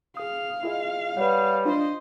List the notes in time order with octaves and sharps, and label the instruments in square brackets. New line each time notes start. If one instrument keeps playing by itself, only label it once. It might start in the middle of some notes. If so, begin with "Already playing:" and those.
[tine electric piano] G#4 D#6 [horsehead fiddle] F5
[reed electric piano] E4 [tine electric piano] F4 G#4 D#5
[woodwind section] G3 [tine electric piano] B4 C#5 [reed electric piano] F#5
[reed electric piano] D4 F4 [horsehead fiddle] C5 D#5